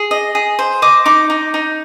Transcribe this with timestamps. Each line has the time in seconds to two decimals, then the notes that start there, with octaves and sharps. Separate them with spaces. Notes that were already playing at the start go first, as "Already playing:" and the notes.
Already playing: G#4
0.11 D#5
0.35 G#4
0.59 C5
0.82 D#5 D6
1.06 D#4 D6
1.30 D#4
1.54 D#4